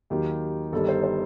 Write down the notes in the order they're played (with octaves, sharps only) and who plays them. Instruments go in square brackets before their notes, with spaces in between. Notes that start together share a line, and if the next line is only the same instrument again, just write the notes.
[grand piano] D#2 D#3 F#3 G4
G1 G2 D#3 G3 A4
C5
C5